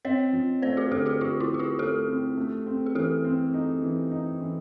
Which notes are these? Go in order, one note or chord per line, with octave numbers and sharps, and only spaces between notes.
C4 C#5 D#5
F3
A3 C5 D5
F#4 G#4
D3 G4 A4
F#4 G#4
F3 F4 G4
E4 F#4
F3
G#4
F4 G4
A3 G4 A4
C4
A3
C4
G#4
E3 G4 A4
C4
D#4
E3
D#4
E3